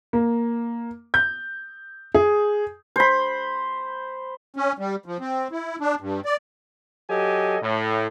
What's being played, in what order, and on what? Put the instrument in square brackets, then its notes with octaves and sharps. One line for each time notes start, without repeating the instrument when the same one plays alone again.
[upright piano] A#3
G6
G#4
[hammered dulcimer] C5 B5
[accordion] C#4
G3
F3
C4
E4
D4
G2
D5
[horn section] F#3 G4 A4 D#5 G#5
A2